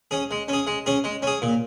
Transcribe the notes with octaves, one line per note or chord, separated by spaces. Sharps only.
C#4 G#4
G#3
C#4 G#4
G#3
C#4 G#4
G#3
C#4 G#4
A#2